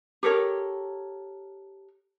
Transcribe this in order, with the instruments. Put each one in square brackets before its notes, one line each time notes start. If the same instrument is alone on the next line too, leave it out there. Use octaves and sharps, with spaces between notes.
[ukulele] G4 A4 A#4 C#5